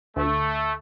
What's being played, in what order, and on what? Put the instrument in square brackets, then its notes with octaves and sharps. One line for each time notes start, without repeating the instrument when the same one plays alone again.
[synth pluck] D2 [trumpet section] A3